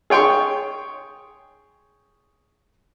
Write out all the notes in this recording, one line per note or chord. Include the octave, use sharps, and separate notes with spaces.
G#4 C#5 G5 C6 C#6